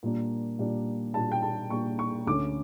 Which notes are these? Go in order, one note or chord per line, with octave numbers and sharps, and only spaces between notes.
A#2 G3 A#3 D4
A#2 G3 A#3 D4
A#2 G3 A#3 D4 A5
G5
A5
A#2 G3 A#3 D4 C#6
C#6
D2 D3 A3 C#4 D6